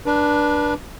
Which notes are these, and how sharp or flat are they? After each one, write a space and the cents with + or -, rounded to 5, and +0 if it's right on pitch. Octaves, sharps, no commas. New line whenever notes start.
D4 +0 B4 -35